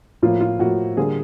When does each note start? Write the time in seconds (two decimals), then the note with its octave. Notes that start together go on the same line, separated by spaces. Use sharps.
0.22 A2 F3 A#3 F4
0.40 F4
0.59 A2 F3 A#3 F#4
0.97 D3 G3 A#3 G#4